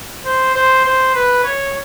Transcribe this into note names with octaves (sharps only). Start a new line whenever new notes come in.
C5
C5
C5
B4
C#5